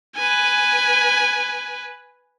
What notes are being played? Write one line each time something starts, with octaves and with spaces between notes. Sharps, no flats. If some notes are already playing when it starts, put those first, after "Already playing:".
B4 G#5